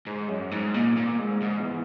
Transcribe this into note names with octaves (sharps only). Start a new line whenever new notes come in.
G#2
F#2
G#2
A#2
A#2
G#2
G#2
E2